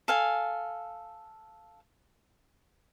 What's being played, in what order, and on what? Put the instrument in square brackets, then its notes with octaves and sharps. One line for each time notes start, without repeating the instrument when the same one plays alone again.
[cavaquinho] A4 F5 G#5